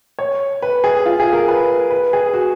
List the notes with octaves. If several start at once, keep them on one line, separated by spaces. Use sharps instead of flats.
C#5
B4
G#4
F4
G#4
A#4
B4
B4
G#4
F#4